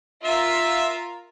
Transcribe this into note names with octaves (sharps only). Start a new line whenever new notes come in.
F4 A#4 E5